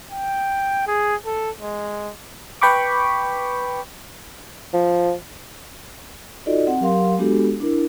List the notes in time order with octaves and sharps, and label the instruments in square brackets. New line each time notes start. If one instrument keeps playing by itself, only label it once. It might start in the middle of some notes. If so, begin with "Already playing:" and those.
[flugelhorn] G5
G#4
A4
G#3
[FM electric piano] B4 G5 B5 C#6 D6
[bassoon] F3
[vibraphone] D#4 F4 F#4 A4 D5 D#5
C4 F#5
F#3 G4 A#4 F5 C6
G#3 B3 D4 F#4 G4 A4
D4 E4 A#4